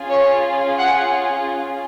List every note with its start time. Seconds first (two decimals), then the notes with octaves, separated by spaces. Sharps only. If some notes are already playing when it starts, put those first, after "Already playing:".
Already playing: C#4 F4 G#4
0.11 C#5
0.79 F#5